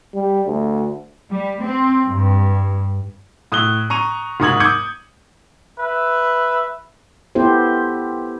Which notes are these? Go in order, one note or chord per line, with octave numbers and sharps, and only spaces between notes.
G3
D2
G3
C4
G2
A2 D#6 F#6 G7
A#5 C#6 D#7 F7
F#1 G#2 C#6 D#6 G#6 F#7
D6 D#6 G6 G#6 C#7
B4 E5
B3 E4 G4 A4 C5